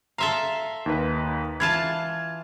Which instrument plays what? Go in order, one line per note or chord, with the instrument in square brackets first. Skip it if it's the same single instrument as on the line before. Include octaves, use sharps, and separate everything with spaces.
[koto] A4 E5 F5 [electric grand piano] A#5 C6
[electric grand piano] D#2 D#4 B4
[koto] E3 F4 A5 [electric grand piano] G#6